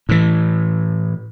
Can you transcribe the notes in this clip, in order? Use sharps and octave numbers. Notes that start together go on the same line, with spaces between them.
A2 E3